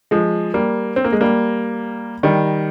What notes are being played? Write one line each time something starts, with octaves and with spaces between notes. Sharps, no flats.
F3 G#3
G3 A#3
C4
A#3
G#3
G3 A#3
D#3 G3